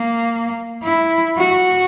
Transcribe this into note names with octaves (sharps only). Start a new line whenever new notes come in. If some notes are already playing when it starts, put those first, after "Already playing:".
Already playing: A#3
E4
F#4